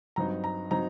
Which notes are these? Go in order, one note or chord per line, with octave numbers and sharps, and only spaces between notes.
G2 F#3 C4 D#4 A#5
A#5
F#3 C4 D#4 A#5